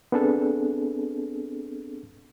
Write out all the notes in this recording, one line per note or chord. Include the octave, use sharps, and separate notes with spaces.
B3 C4 D4 G#4 A4